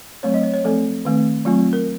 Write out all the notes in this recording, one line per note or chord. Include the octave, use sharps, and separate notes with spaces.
F#3 A3 C4 C#5
D#5
C#5
C#5
F3 A3 C4 A4
D#3 A3 C4
F#3 A3 C4 F4
A#4